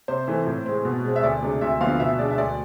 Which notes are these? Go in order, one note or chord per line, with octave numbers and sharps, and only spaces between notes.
C3 C5
E3 A3 C4
A2
G#3 C4
B2
G#3 C4
E5
D2 D5
C3 G#3 D4
D2 E5
D3 F3 B3 F5
B2 E5
G#3 D4 D5
E5
D2 D5